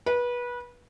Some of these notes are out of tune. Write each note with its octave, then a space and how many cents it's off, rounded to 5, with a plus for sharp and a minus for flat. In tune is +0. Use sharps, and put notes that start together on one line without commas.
B4 -25